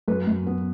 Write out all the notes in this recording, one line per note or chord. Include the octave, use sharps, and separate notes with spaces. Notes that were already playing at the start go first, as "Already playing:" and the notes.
F#2 B4
F#2
B3